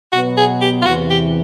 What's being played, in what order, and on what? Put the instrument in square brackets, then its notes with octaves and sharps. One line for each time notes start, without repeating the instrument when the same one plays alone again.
[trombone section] B2 F#3 B3 [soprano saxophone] F#4
[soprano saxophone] G#4
G4
F4
[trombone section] E2 C3 E3 [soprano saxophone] F#4
[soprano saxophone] G4